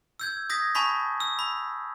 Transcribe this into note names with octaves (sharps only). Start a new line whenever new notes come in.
E6 G6 G#6
D#6 G#6 A#6 B6
G#5 A5 B5 C#6 B6
E6
B5